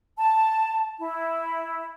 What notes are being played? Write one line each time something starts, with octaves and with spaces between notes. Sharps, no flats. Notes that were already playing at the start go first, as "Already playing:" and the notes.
A5
E4